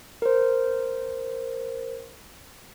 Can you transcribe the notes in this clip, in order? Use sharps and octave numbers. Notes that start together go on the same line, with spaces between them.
A#4 C5